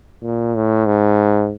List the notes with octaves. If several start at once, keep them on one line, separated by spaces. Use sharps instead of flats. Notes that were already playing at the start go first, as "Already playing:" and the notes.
A#2
A2
G#2